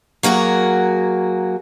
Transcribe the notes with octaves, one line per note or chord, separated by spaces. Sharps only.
F#3 A#3 F#4 G#4